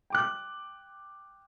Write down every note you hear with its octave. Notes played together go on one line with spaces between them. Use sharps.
G5 D6 F#6